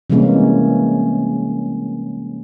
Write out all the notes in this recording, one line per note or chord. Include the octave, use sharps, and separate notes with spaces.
C3 E3 G3 G#3 A#3 C#4